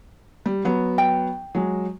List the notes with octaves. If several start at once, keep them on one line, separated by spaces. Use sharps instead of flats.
G3
F#3 B3
G5
F#3 G#3